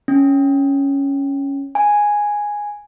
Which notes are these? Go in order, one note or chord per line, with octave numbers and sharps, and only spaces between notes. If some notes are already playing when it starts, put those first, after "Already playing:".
C#4
G#5